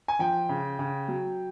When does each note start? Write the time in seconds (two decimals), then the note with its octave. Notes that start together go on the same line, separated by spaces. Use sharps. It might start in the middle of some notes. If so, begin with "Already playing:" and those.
0.08 G#5
0.19 F3 G5
0.49 C#3
0.79 C#3
1.08 F#3